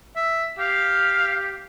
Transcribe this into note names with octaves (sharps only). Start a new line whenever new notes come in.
E5
G4 F5